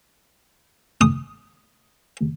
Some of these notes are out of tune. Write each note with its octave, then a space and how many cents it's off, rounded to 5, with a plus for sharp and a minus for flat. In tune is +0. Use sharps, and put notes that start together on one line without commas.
D#6 +0